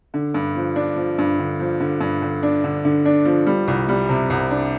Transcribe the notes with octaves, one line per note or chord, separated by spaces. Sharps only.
D3
G2
F3
D4
F3
G2
D3
F3
D3
G2
D3
D4
D3
D3
D4
F3
G3
C2
G3
C3
C2
D4